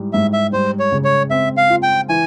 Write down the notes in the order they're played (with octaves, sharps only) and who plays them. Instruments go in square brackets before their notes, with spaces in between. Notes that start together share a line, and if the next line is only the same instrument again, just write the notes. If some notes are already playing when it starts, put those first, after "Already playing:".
Already playing: [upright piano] G#2 E3 G3
[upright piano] G#2 [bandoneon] E5
[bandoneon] E5
[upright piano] G3 [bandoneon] C5
[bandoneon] C#5
[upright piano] C#3
[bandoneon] C#5
[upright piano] C4 [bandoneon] E5
[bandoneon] F5
[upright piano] F4
[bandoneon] G5
[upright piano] E3 [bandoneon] G#5